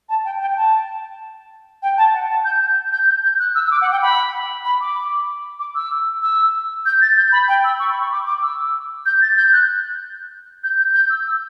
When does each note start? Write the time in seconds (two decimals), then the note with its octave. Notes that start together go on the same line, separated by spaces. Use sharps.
0.09 A5
0.25 G5
0.41 G5
0.56 A5
1.82 G5
1.98 A5
2.14 F#5
2.30 A5
2.45 G6
2.61 G6
2.92 G6
3.07 G6
3.23 G6
3.40 F#6
3.55 E6
3.66 E6
3.71 D6
3.81 F#5
3.92 G5
4.02 B5
4.65 B5
4.81 D6
5.59 D6
5.75 E6
6.22 E6
6.86 G6
7.02 A6
7.17 G6
7.32 B5
7.48 G5
7.64 E6
7.80 C#6
7.90 B5
8.01 C#6
8.12 D6
8.27 D6
8.42 E6
9.06 G6
9.22 A6
9.37 G6
9.53 F#6
10.64 G6
10.79 G6
10.94 G6
11.10 E6
11.26 E6